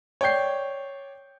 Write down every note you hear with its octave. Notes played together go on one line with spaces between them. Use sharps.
C#5 D5 G5 G6 C7